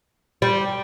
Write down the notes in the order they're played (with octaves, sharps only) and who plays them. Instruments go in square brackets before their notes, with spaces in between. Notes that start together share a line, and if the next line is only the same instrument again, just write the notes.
[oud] G3